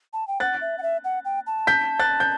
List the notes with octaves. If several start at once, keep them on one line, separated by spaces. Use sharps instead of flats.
A5
G5
F#5 F#6 A6
E5
F#5
E5
F#5
G5
A5
G6 B6
F#6 A6
G6